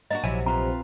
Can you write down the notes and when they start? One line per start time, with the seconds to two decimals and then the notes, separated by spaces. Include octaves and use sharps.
0.11 A#3 D4 F#4 D#5
0.24 A#1 C3 F#3 E4 C#5 G#5
0.46 C4 F4 B4 A#5